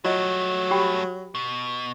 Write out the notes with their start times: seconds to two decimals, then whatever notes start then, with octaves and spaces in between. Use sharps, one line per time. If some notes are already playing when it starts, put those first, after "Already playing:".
0.05 F#3 G3 A3 F4 D#5
0.71 G4 G5 B5
1.35 B2